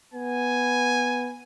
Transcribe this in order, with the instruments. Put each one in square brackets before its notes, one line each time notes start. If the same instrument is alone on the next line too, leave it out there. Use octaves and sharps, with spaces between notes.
[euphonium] B3 [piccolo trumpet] G#5